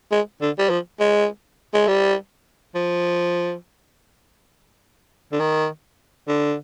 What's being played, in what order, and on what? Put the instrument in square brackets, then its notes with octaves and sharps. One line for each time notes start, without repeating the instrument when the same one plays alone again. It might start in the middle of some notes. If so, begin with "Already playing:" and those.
[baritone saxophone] G#3
D3
G3
F3
G#3
G#3
G3
F3
D3
D#3
D3